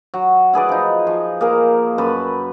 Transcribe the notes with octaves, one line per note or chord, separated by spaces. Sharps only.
F#3
E4 G#4 B4 D5
F3 D#4
F3
A#3 G#4 A#4
F#2 B4 A5 B5